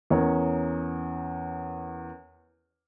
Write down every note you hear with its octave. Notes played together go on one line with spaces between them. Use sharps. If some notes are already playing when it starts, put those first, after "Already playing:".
E2 C#4 A#4 C#5